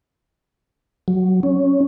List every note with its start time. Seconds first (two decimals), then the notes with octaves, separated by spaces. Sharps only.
1.08 F#3
1.43 C#4